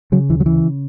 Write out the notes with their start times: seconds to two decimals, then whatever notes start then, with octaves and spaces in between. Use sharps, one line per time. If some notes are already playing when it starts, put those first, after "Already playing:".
0.12 C#3 F#3
0.29 D2 E3
0.40 F#3
0.46 C#3 E3